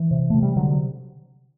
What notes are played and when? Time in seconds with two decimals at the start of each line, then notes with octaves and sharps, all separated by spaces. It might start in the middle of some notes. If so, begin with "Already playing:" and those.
Already playing: E3
0.11 C3
0.30 C3 A3
0.43 G3
0.56 D3 F#3